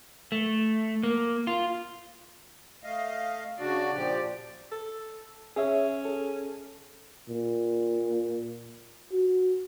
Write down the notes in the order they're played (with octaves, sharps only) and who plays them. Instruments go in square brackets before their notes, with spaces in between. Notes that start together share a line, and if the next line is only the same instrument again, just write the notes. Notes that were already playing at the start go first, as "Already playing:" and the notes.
[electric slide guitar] A3
A#3
F4
[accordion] A3 D#5 F5
[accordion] C#3 D4 F#4 [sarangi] D5
[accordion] A#2 F3 G4
[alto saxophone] A4
[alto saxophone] C#4 [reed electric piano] G#4 C#5 E5
[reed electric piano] G#4 A4
[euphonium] A#2
F#4